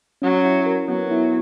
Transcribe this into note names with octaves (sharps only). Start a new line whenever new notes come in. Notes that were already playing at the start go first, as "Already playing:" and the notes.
F#3 C#4
E4
A#4
F#3 B3
E4